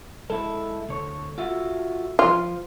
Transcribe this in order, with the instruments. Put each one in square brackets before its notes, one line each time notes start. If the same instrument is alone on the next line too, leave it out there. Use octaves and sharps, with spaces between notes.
[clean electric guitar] G#3 E4 [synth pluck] A4
[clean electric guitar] D2 C#5
F4 F#4 E5
[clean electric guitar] F3 C5 F5 [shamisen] F4